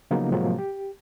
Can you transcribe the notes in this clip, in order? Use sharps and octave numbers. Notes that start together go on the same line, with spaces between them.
C#3 F3 F#3 A#3 B3 D#4
A2 C3 F3 F#3 G#3 A#3
G4